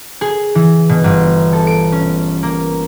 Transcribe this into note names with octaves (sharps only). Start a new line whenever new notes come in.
G#4
E3
B2
G1
A4
D7
C#4
A#3